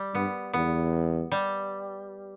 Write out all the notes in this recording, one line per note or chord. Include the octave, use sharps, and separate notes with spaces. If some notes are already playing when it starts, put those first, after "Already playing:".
Already playing: G3
G2 B3
E2 B3
G3